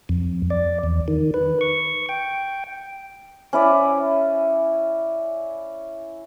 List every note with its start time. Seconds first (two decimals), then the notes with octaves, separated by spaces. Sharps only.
0.09 F2
0.50 D5
0.84 E2
1.08 D#3
1.34 B4
1.61 C#6
2.09 G5
3.53 C#4 E4 D5